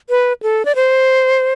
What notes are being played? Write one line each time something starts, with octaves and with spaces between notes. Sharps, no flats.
B4
A4
D5
C5